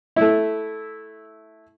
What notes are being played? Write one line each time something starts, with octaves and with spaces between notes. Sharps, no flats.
A3 E4